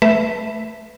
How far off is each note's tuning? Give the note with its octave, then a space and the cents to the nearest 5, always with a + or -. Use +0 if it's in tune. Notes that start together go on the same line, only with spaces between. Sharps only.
A3 +0 B4 +0 E5 +0